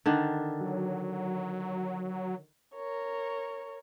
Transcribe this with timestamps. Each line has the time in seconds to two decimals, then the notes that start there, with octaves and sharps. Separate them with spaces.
0.06 D3 D#3 D4
0.60 F#3
2.75 A#4 C#5